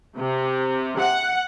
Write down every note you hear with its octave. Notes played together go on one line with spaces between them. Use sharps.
C3
F#5